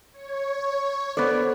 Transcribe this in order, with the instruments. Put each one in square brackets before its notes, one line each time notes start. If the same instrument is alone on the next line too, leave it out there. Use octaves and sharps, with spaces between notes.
[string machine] C#5
[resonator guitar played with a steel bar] B3 D5 [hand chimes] A4 C5